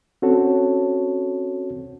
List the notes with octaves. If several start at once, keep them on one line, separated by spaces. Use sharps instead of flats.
C4 C#4 F#4 A4 C#5